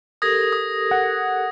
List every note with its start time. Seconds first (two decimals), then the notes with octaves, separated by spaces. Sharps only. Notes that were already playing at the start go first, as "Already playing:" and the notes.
0.22 G4 A4 A#4 D#6 G#6 A#6
0.53 D#6
0.91 F#5